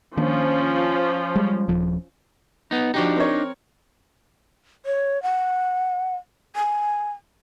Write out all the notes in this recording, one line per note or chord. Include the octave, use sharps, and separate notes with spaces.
D#3 F3 A#3 C#4 D4
G3 G#3
D#1 F3
B3 D#4
F3 D4 D#4 F#4 G4
C4 A#4 C#5
C#5
F#5
G#5